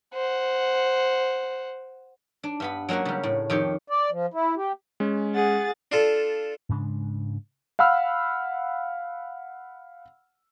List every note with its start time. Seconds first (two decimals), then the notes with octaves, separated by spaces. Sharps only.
0.14 C5 F#5
2.43 D4
2.60 G2 B3 B5
2.89 F#3 G#3 A#3 C#4 F#4
3.05 C#3 G3
3.23 A2
3.50 F2 D#3 G4 C#5
3.88 D5
4.11 F3
4.34 E4
4.57 G4
5.00 G#3 C#4
5.33 G#4 F#5 A6
5.92 D4 F4 A4
6.69 G#2 C#3 G#3 D4
7.79 F5 F#5 B5 E6 F6